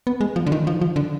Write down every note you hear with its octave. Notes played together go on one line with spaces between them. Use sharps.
B3
G#3
F3
D3
D#3
F3
F3
D3